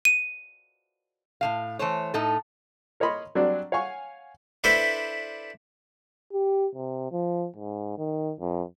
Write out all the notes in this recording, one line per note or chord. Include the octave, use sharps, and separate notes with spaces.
D#7
A2 G#3 F5
E3 A3 C5 C#5
A2 D#4 A4
A#4 C#5 D#5 B5 C6
F#3 G3 C4 D4
C#5 F5 F#5 G#5 C#6
D4 E4 A4 B4 C5
G4
C3
F3
G#2
D#3
F2